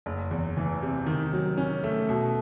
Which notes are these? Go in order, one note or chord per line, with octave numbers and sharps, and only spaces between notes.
F#1
E2
E3
C3
D#3
F#3
C#4
A3
B2